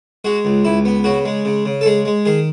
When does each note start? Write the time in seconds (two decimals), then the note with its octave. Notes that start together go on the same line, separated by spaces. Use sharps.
0.25 G#3 F#4
0.45 C#2
0.65 C#2 E4
0.85 B3
1.04 C#3 F#4
1.25 G#3
1.45 C#3
1.66 C#3
1.81 A4
1.86 G#3 G#4
2.05 G#3
2.25 D#3 G#4